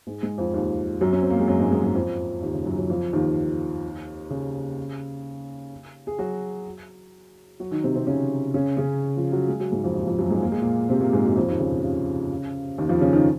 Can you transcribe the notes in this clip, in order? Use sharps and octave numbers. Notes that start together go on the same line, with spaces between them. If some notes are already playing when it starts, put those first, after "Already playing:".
G#2 G#3
G#2 G#3
F2 F3
D#2 D#3
F#2 F#3
C#4
C4
A#3
G#3
F#2 F#3
G#2 G#3
G#2 G#3
G#2 G#3
F2 F3
D#2 D#3
C#3
F#2 F#3
F#2 F#3
F2 F3
D#2 D#3
C#3
G#4
F#3 F#4
F#3 F#4
D#3 D#4
C3 C4
C3 C4
C#3 C#4
C#3 C#4
C#3 C#4
F3 F4
F#3 F#4
G#3 G#4
F#3 F#4
G#2 G#3
F2 F3
D#2 D#3
F2 F3
F#2 F#3
G#2 G#3
A#3
G#3
A#2 A#3
C3 C4
A#2 A#3
G#2 G#3
F#2 F#3
F2 F3
D#2 D#3
C#3
C3
C#3
D#2 D#3
F2 F3
C#3 C#4
D#3 D#4